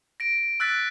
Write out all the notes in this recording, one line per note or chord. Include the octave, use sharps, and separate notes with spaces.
A#6 D7
E6 F#6 A6 B6